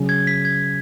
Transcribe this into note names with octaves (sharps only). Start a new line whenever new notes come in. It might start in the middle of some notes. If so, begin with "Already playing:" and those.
Already playing: C#3 F#3 C#4
G#6
B6
G#6